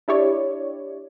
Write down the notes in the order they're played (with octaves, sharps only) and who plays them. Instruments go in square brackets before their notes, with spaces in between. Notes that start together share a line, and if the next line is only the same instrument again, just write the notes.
[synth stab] D4 E4 G4 C#5 D5